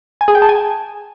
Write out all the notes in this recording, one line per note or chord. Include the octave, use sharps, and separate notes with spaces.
G#5
G#4
G5
A5
G#5